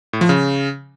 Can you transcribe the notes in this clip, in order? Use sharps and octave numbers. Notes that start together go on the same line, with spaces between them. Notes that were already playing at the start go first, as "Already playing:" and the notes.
A2
F3
C#3